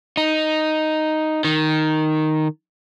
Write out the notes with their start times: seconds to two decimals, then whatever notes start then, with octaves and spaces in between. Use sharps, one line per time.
0.17 D#4
1.45 D#3